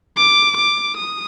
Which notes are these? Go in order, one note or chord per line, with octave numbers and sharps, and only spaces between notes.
D6
D6
D#6